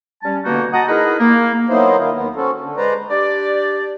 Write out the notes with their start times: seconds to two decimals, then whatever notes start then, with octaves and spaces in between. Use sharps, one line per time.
0.22 G3 C#4 A5
0.45 B2 D3 A#3 B3 D#4 F#4
0.72 F#4 D#5 F#5 A5 A#5 D#6
0.88 D#4 E4 G#4 A#4 B4 D#5
1.20 A#3
1.69 F#3 A#3 B3 D#4 E4 C5
1.97 D#3 F4
2.13 D#2 B3
2.36 C4 C#4 F#4 A4
2.60 D3
2.77 G#3 B4 C5 D5 A#5
3.10 D4 G4 D5